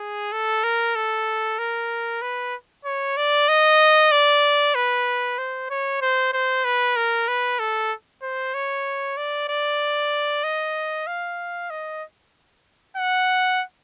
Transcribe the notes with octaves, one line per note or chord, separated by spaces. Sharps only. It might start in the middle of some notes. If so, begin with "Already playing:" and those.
Already playing: G#4
A4
A#4
A4
A#4
B4
C#5
D5
D#5
D5
B4
C5
C#5
C5
C5
B4
A#4
B4
A4
C5
C#5
D5
D5
D#5
F5
D#5
F#5